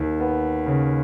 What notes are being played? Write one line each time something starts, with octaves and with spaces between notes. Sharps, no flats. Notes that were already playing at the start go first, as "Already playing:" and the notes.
Already playing: D#2
B3
C#3